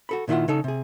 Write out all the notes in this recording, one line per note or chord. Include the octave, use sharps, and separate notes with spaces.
F#4 A4 B5
A#2 D#3 E4 F4 F#5
C#3 D#4 A4
C3 G#4